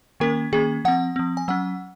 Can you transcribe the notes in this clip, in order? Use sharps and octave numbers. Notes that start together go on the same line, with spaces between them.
D#3 A#3 C#4 A#4
D#3 A#3 C#4 G#4
F3 C4 F#5
F3 C4
G#5
F#3 C#4 F#5